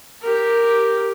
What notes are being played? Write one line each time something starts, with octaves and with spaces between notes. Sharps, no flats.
G4 A#4